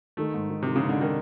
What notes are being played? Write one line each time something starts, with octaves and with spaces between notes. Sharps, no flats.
D#3 A3
G#2
D#3
C3 D#3
C#3
G#2
D3
D#3